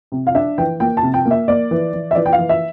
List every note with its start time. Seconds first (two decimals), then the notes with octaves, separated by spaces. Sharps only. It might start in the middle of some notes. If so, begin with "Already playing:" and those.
0.12 C3
0.27 F5
0.35 D4 E5
0.58 E3 G5
0.80 A#3 G5
0.97 A5
1.03 C3
1.14 G5
1.25 A#3
1.31 E5
1.48 A#3 D5
1.71 E3
1.93 E3
2.11 E5
2.15 E3 D5
2.26 G5
2.33 F5
2.39 E3
2.49 E5